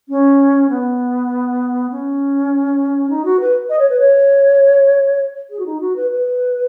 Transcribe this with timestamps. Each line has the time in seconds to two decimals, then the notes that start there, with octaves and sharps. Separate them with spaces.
0.09 C#4
0.69 B3
1.90 C#4
3.10 D#4
3.25 F#4
3.40 B4
3.69 D#5
3.79 C#5
3.90 B4
3.99 C#5
5.50 G#4
5.59 F#4
5.66 D#4
5.80 F#4
5.96 B4
6.10 B4